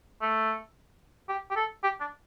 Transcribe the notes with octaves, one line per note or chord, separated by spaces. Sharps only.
A3
G4
G4
A4
G4
D4